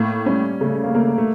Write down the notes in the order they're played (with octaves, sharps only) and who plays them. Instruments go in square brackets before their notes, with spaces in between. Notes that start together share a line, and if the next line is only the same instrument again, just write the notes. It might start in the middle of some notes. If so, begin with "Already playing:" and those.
Already playing: [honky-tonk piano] A2 [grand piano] A#3
[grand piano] G3 [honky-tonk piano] C#4
[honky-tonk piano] C#3 [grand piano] A3
[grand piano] A#3
[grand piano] A3 [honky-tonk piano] A#3
[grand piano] A3